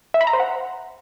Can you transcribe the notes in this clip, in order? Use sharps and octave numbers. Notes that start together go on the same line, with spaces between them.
E5
B5
A#5
C5
F#5